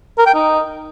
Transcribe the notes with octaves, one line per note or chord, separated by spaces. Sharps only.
A#4
G5
D#4